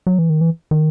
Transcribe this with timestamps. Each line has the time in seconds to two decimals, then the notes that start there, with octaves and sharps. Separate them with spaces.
0.07 F#3
0.19 E3
0.30 D#3
0.41 E3
0.71 D#3